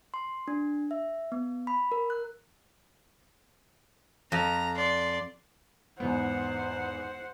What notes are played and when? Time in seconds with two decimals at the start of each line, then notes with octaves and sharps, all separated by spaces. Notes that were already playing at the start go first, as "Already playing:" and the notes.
0.14 C6
0.48 D4
0.91 E5
1.32 B3
1.67 B5
1.92 A#4
2.10 F#6
4.32 F2 A#5
4.76 D5 C6
6.00 E2 G#2 B3 C5 F#5